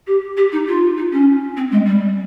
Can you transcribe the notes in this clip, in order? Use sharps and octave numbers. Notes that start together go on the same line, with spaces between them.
G4
G4
D#4
F4
D#4
C#4
C4
G#3
G3